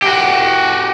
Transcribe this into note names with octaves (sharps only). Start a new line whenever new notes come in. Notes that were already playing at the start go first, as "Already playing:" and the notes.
F#4 G4